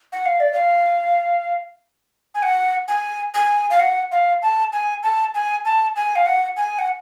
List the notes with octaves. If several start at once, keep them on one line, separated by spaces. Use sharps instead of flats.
F#5
F5
D5
F5
G#5
F#5
G#5
G#5
F5
F#5
F5
A5
G#5
A5
G#5
A5
G#5
F5
F#5
G#5
F#5